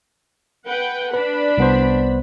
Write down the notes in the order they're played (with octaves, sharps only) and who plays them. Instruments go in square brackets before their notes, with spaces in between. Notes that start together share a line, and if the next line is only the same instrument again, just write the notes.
[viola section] B4 F#5 G5
[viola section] D4 B5 [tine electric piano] B4
[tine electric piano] C2 B3 C5